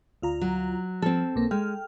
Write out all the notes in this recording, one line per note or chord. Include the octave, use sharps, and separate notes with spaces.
D2 F4 A#5
F#3
F3 C4 A4
B1 A#3
G#3 G5 F6